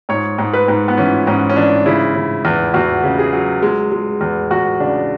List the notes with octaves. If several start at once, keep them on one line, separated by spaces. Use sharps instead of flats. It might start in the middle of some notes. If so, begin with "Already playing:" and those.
G#2 C#5
G#2
B4
G#2
B3
E3 C#4
G#2 C#4
C#4
E3 D4
C#3 E4
C#3
E2
E2 F#4
C#3
G#4
F#3
G#3
G#3
E2
E2 F#4
C#3 D4